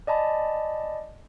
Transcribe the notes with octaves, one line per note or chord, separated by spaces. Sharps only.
D5 D#5 G#5 A5 B5